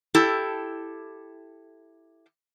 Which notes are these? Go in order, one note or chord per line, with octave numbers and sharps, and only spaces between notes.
E4 G4 A4